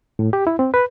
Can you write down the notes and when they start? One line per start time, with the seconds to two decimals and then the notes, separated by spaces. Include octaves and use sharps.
0.19 A2
0.33 G4
0.47 E4
0.59 C4
0.74 B4